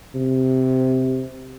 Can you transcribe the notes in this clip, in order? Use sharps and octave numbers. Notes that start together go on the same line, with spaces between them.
C3